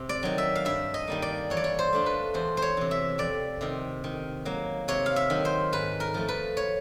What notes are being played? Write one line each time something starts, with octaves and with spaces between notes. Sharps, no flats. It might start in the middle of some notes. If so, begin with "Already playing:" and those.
Already playing: C3
D5
D#3 F#3
E5
F5
G2 E5
D#5
D#3 G3 A#3
D5
E3 C#5
D5
C#5
C5
A3 D4 F4
B4
E2 C5
C5
C#5
C3 E3
E5
F2 D5
C3 D#3
D#3
F#3 A#3
C3 C#5
F5
E5
D#3 F#3
C5
G#2 B4
A#4
F3 A3
B4
C#5